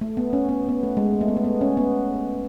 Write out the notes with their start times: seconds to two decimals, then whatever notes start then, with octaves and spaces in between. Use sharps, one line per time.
0.01 A3
0.17 B3
0.33 C#4
0.49 B3
0.69 B3
0.83 A3
0.97 G#3
1.21 A3
1.28 B3
1.37 A3
1.44 B3
1.61 C#4
1.77 B3